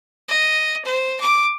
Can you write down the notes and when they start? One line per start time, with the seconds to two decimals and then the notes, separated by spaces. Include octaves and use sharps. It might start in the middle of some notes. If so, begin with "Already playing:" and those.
0.29 D#5
0.85 C5
1.20 D6